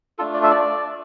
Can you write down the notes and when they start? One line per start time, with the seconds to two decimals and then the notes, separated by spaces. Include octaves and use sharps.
0.18 A3 D4 F4 A4
0.34 D5
0.43 E5
0.51 D5